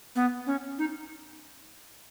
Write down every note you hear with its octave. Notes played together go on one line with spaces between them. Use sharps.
B3
C#4
D#4